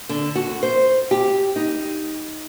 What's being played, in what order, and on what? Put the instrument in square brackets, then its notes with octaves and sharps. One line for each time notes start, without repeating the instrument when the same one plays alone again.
[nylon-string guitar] D3
F#4
C5
G4
D#4